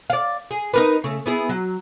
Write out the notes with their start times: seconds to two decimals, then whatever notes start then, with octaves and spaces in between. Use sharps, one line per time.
0.10 D5 F5
0.51 G#4
0.74 D#4 A#4 B4
1.04 C#3 A3
1.26 B3 E4 G#4
1.49 F#3